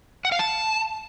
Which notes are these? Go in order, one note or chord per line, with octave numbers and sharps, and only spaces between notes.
F#5
F5
A5